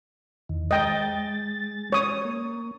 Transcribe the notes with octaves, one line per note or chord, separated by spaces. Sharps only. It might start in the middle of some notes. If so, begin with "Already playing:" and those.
E2 D#3
G#3 D#5 G5 A6
C#5 D#6
A#3